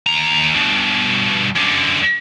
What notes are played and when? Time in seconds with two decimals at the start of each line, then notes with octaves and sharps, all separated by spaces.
0.06 D#2 A#5
0.55 G2 B2
1.56 F#2 D3